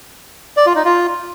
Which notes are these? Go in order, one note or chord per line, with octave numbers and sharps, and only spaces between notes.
D5
F4
D#4
F4